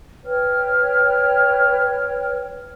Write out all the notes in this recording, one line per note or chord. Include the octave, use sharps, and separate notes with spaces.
B4 C#5 G5 F6